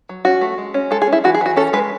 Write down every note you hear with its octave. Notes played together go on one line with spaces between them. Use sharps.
F#3
C#4 F#4
A3
G#3
C#4
G#3 A4
G#4
C#4
E4
E3 F#4
G#4
E3 F#4
C#4 A4
G#3 B4